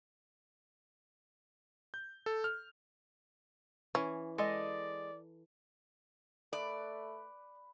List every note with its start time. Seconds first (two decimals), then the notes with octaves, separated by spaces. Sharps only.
1.94 G6
2.26 A4
2.44 F6
3.95 E3 C#4
4.38 G#3 A4 D5 D#5
6.53 A3 B4 D5